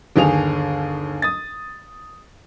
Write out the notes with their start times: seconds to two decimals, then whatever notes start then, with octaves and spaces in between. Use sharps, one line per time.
0.16 G1 D#2 G#4 F7
1.22 D#6 A6